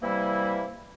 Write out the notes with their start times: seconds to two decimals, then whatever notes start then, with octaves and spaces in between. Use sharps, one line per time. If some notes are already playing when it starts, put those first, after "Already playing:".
0.01 C3 E3 G3 A#3 E4